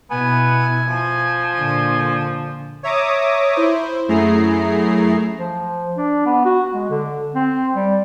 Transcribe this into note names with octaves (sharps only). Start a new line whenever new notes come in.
B2 B3 E4 G#5
F3
A#2 D3
C#5 E5 A#5 D6 D#6
E4 C5
F#2 A3 E4 G#4 A#5 C7
F3
D4
B3
F#4
G#3
D3
C4
G3